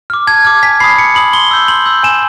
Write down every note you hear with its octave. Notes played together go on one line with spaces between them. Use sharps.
D6 F6
A5 G#6
D6 F6 G#6
G#5 B6
B5 D#6 C7
G#5 C#7
B5 D#6 F#7
C6 G7
E6 G6
C6 F#7
E6 G6
G#5 E7